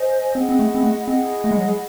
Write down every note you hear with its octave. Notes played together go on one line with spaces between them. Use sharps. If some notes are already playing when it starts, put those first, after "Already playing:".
Already playing: C5 D#5 G#5
C4 E4 G#4 D#5 F#5
C4
A3
C4
A3
C4 E4 G#4 D#5 F#5
A3
G#3
F#3
G#3